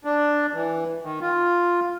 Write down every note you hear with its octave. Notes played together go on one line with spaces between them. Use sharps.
D4
E3
D#3
F4